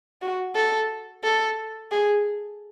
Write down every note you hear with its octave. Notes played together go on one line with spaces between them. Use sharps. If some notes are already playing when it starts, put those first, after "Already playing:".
F#4
A4
A4
G#4